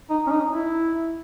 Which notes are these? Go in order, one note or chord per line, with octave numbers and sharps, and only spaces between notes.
D#4
C#4
D#4
E4